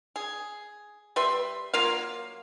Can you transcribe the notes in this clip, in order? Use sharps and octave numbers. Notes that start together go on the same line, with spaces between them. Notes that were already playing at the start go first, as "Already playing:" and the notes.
G#4
G3 B4 E5 C6
F#3 A#3 F4 F5